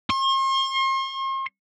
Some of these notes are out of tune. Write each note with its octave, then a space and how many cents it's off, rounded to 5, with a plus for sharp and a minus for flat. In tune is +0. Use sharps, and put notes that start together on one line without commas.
C6 +45